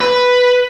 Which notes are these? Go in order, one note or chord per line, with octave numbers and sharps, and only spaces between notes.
B4